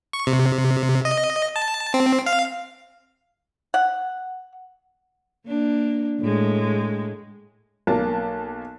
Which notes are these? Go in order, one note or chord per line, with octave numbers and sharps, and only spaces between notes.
C#6
C3
D#5
A5
C4
F5
F#5
A#3 D4
A2 G#3
B1 A#3 A5